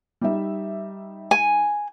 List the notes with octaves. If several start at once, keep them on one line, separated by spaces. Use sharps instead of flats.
G3 D#4 E5
G#5